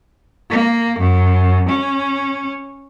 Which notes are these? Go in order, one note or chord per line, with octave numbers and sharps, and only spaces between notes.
A#3
F#2
C#4